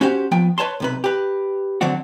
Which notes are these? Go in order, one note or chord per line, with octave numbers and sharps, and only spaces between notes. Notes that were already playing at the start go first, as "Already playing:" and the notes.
C#4 F#4 G4 C5
F3 B3 G5
B4 C#5 A5 C6
B1 C3 B4
G4 B4
D3 F#3 C4 D4 F#4